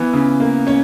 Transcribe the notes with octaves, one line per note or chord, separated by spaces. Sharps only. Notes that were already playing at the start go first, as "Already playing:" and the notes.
Already playing: E3 B3 B4
C#3
A#3
C#4 C#5